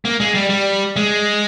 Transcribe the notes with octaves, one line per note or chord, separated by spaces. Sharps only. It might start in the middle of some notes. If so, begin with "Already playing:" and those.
A#3
G#3
G3
G3
G#3